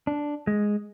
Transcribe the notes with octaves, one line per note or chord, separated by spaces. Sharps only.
D4
G#3